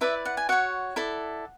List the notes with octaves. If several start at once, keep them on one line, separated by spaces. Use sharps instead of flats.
E4 B4 D5 E5
F#5
G#5
F#4 C#5 F#5
E4 A4 D5